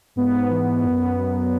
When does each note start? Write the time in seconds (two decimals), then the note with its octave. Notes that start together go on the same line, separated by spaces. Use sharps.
0.16 G#2 B3
0.50 E3
0.84 F#2 B3
1.18 F#3